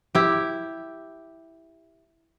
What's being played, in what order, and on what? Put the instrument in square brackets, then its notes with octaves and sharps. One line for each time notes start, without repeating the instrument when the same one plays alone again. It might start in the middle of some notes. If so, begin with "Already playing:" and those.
[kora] E4 G4